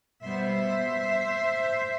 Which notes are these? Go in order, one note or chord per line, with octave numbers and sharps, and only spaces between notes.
B2 G3 B3 C5 E5